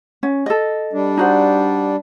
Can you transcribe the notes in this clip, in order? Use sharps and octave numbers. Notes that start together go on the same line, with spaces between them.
C#4
A4 D#5
G3 D4
D#4 F#4 C5